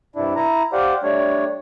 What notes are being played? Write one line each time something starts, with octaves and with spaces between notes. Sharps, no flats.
G2 C3 D4 E4
E4 A#5
G4 C5 D5 F5 F#5
G3 A3 D4 C#5